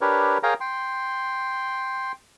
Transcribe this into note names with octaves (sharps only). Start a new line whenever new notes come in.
D4 G4 A#4 B4 C#5
G#4 A#4 C#5 F5 G5 A#5
G5 C6